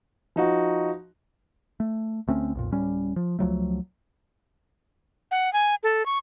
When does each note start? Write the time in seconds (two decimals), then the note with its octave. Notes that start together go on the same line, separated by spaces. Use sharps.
0.36 F3 D#4 F#4
1.80 A3
2.28 D2 A3 C4 C#4
2.55 B1 F2 A#2
2.72 D1 A2 G3 C#4
3.16 F3
3.39 C#2 F3 F#3 A3
5.31 F#5
5.53 G#5
5.83 A4
6.06 C#6